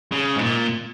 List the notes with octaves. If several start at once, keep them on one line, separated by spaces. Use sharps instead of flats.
C#3
G#2
A#2